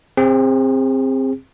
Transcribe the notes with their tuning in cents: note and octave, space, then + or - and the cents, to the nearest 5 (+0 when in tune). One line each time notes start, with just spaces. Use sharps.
C4 +10 G#4 -35